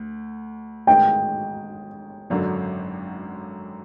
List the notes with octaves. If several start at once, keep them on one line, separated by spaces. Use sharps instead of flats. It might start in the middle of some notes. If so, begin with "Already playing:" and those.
Already playing: D2
A1 G#2 D#3 G#3 B3 G5
G#1 F#2 D3 F#3